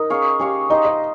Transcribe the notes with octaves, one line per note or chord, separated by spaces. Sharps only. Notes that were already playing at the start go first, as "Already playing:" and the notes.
Already playing: D#4 A#4
C#4 G#4 C#5 F5
C#4 G4 G#4 C#5 F5
D#4 G4 C5 D#5
D#5